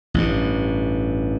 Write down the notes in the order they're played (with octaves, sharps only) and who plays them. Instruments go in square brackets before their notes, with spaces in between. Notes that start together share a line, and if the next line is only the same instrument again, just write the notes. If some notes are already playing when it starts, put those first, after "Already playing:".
[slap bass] A1 G2